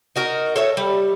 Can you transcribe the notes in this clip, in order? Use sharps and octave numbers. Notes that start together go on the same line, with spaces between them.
D#4 F#4 A#4
A4 C#5 E5
G3